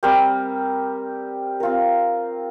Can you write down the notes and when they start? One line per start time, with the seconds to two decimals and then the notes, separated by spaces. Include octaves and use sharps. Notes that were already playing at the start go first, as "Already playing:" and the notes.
0.03 G3 C4 G4 A#4
1.60 C4 F4 A#4